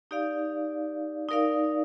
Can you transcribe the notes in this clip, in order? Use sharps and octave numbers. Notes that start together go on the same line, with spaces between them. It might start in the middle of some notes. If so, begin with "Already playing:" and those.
D#4 G4 D5 F5
D#4 A#4 D5 F5